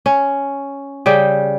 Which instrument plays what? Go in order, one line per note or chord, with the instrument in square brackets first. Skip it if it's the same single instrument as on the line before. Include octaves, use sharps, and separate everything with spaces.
[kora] C#4
C#3 G3 G4 G5